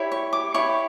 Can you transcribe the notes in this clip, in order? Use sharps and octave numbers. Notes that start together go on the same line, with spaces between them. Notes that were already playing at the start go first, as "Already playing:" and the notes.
Already playing: E4 G4 C#5
C#6
D6
E4 G4 C#5 C#6